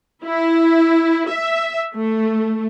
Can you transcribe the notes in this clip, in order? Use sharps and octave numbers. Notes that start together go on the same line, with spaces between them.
E4
E5
A3